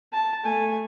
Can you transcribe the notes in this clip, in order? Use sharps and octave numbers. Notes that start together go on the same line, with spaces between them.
A5
A3 G#5